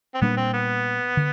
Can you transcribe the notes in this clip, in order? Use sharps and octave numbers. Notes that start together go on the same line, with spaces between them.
C4
A#2 G3 A#3 B3 D4
C4
B3
D3